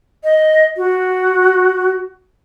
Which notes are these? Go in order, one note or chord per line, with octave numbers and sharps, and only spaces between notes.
D#5
F#4